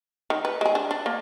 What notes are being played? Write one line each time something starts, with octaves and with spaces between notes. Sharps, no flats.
D#3
B4
G#3 G#4
D4
D4
A#3